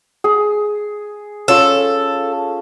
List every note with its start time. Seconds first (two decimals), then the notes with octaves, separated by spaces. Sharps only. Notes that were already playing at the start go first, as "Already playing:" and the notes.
0.24 G#4
1.48 C#4 F4 A4